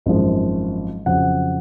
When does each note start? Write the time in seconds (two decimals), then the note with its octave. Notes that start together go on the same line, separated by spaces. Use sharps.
0.06 G#1 F#2 F3 G#3
1.06 F2 C#3 F#3 F#5